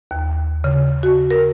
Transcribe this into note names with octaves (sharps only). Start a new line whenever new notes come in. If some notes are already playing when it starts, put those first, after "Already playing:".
D#2
C#3
F#4
A#4